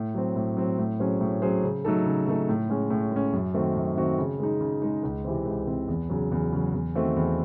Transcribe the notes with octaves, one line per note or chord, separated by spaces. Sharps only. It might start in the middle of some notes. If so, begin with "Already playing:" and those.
Already playing: A2
F#3 C4
A2
F#3 C4
A2
F#3 C#4 G#4 C5
A2
F#3 C#4 G#4 C5
C#3
F#3 A3 D#4 A4
C#3
F#3 A3 D#4 A4
A2
G#3 C#4
A2
G#3 C#4
F#2
D#3 A3 C4 F#4
F#2
D#3 A3 C4 F#4
C#3
G#3 D#4
C#3
G#3 D#4
C#2
C3 E3 C4
C#2
C3 E3 C4
E2
C#3 F#3
E2
C#3 F#3
E2
D#3 A3 C4 F#4
E2